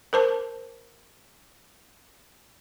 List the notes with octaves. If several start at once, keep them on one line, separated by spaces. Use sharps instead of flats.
A#4 C5 A5